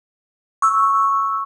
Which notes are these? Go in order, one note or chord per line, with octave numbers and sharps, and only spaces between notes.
C#6 E6